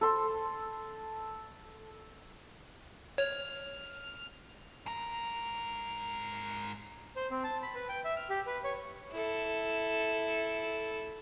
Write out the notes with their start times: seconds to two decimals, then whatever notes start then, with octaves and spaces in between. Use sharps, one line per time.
0.01 A4 C6
3.18 C#5 F6
4.86 G#2 A#4
7.16 C5
7.31 C4
7.44 A5
7.63 B5
7.75 B4
7.89 G5
8.04 E5
8.17 F6
8.30 G4
8.47 B4
8.64 C#5
9.12 E4 A4